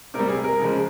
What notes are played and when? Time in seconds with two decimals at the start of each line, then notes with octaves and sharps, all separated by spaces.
0.14 C3 A#4
0.19 G3
0.29 G#4
0.44 A#4
0.59 C#3 F3 G#3